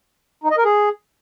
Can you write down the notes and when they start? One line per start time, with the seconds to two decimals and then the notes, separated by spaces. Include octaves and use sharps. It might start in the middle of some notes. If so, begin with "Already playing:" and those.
0.44 D#4
0.51 D#5
0.58 A#4
0.65 G#4